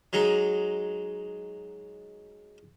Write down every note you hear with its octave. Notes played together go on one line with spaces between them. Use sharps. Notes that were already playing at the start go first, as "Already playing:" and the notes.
F#3 G#3 D#4